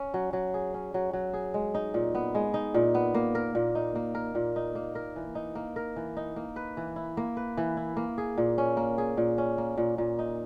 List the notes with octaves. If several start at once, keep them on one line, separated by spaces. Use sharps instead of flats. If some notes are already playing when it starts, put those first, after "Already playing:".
Already playing: C#4
F#3
F#3
G#4
C#4
F#3
F#3
G#4
G#3
D#4
A#2
B3
G#3
D#4
A#2
B3
A#3
A#4
A#2
D#4
A#3
A#4
A#2
D#4
A#3
A#4
E3
D#4
A#3
A#4
E3
D#4
A#3
B4
E3
E4
A#3
B4
E3
E4
A#3
G#4
A#2
C#4
A#3
G#4
A#2
C#4
A#3
A#2
A#2
D#4